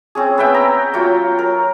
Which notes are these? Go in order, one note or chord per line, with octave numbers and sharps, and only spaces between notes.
C4 C#4 G#4
B3 E5 G5
A#5
F#3 F4 G5
A#4